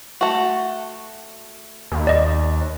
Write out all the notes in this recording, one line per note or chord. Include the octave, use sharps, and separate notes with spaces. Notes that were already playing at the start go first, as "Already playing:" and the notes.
A3 F#4
D#2
D5 D#5